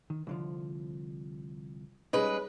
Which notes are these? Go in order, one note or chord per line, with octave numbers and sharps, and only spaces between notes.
D#3
C2 D3 F3
G3 G#3 C#4 D#4 B4